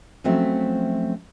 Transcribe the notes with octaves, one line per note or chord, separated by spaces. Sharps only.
F3 F#3 A3 C4 C#4 E5